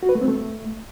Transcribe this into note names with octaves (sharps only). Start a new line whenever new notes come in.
F#4
B4
A3
C4
A3